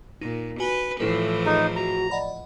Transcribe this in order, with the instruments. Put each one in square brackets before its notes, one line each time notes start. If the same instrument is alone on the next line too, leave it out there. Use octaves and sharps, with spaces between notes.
[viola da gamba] A#2 [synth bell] D#4
[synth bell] F#4 G#5 G7 [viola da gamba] B4
[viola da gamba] A2 E3 F3 [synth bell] E4 B4 [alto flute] A4
[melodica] D#4 [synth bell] G#4 D#5
[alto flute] F#4 [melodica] A#5
[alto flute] D5 [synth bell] D#5 F#5 B5